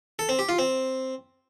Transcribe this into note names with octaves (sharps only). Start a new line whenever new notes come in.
A4
C4
G4
F4
C4